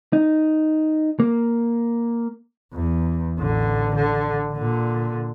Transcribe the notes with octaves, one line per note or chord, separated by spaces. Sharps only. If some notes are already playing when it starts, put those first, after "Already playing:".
D#4
A#3
E2
A1 D3
D3
A#2 D3